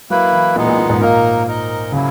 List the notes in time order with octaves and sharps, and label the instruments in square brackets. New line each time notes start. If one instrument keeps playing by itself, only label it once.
[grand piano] F#3 [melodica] A#3 E4 B4
[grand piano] E3
[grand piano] A#2 [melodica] G#3 B3 D#4
[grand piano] A#2
A#2
G#2
[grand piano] A#2 [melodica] A#3 D#4 A#4
[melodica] D#4 A#4 D#5
[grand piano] C#3 [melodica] F#3 A#3 E4